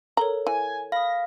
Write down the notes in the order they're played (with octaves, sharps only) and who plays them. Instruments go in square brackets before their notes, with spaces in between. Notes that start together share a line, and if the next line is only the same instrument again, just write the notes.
[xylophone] A4 A#4 C#5 [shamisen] A#5
[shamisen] E3 [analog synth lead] G#5
[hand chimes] F5 [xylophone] B5 D#6 [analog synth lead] A#6